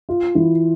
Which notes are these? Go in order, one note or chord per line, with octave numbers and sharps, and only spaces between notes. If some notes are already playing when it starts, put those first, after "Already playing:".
F4
E3